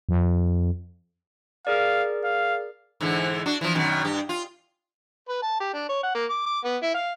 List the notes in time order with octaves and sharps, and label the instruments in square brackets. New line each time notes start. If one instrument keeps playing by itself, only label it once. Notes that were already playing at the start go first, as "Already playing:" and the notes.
[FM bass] F2
[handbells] G#4 A#4 D5 [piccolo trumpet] F5
[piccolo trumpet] F5
[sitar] G#2 D3 E3
D4 F#4
E3 F3
F#2 B2 D#3
G2 G4
F4
[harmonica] B4
A5
G4
D4
C#5
F#5
A#3
D6
D6
B3
E4
F5